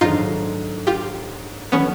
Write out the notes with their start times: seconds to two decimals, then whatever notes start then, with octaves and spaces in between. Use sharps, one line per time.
0.01 G#2 D#3 F#3 A3 D4 D#4 F4
0.87 F4 G4
1.72 D#3 F#3 A3 B3 C#4